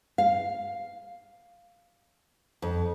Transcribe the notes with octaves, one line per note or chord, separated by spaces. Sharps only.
F5
F2